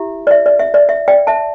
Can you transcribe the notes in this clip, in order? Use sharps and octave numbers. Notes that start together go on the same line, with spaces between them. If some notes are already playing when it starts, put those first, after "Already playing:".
Already playing: E4 G4 E5
D5
E5
D5
E5
D5
E5
D5 G5
E5 A5